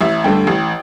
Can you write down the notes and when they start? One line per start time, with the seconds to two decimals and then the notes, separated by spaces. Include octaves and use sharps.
0.01 A1 E5
0.24 G2 D3 A3 G5
0.47 A1